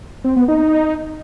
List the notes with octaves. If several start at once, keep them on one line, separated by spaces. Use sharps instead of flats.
C4
B3
D#4